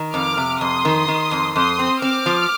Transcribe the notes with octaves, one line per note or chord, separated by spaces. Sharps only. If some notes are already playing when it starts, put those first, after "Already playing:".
Already playing: D#3
F2 D6 F6
C3
F2 C6 D#6
D#3
D#3
F2
F2 C6 D#6
C4
C4 D6 F6
F3